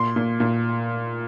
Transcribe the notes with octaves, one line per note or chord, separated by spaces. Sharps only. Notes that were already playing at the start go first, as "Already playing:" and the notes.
Already playing: A#2 C6
A#2
A#2